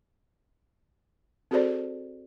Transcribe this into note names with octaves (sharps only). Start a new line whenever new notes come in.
C4 F#4 G#4 A4 C5 D5